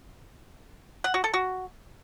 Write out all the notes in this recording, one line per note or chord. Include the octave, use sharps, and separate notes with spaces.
F#5
F#4
A4
F#4